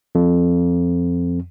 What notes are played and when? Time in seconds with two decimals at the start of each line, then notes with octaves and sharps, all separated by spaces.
0.15 F2